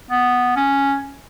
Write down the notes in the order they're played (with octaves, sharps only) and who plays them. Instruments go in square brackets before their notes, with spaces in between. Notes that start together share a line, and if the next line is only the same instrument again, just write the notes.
[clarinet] B3
C#4